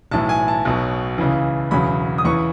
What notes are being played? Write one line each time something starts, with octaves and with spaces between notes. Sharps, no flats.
B1 A2 E3 A5
G#5
A5
B1 B2 F#3
C#2 C#3 E3
E1 E2 C#3 F#3 B5
D#6
E2 C#3 E3 C#6